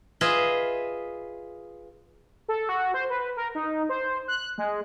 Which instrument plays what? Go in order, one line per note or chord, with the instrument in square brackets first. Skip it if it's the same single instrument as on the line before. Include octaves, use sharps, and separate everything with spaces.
[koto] F4 G#4 B4 D#5 E5
[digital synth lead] A4
F#4
C5
B4
A#4
D#4
C5
F#6
G#3